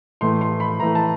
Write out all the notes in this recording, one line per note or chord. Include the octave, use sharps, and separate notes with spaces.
A2 E3 A3 C6
C6
B5
A2 E3 A3 A#5
A5